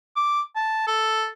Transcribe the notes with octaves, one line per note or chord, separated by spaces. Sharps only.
D6
A5
A4